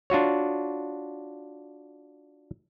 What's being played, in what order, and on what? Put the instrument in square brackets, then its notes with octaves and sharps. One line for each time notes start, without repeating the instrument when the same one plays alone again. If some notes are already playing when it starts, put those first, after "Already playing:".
[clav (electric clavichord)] D4 F4 F#4 C#5